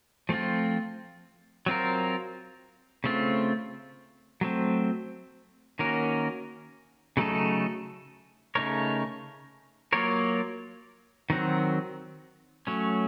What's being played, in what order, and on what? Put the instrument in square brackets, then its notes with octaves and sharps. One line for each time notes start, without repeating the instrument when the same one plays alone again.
[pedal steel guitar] F3 A3 C4 F4
F#3 C4 F4 A#4
C#3 A3 C4 F4
F#3 A3 C4
D#3 A#3 C#4 F#4 A#4
C#3 F#3 A3 D#4 A4
C#3 A3 D#4 A#4 C#5
F#3 A#3 F4 A#4 C#5
D#3 F#3 C4 F#4
F#3 A3 C#4